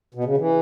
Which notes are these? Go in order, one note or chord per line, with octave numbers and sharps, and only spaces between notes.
B2
C#3
E3